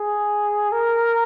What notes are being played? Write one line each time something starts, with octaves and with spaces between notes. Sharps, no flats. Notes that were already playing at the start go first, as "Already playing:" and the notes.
Already playing: G#4
A#4